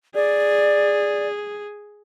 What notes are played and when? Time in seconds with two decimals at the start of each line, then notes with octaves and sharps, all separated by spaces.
0.15 G#4 D5